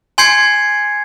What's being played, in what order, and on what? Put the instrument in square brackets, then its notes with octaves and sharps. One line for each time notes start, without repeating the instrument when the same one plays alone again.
[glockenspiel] G#5 C6 G6 G#6 C7 C#7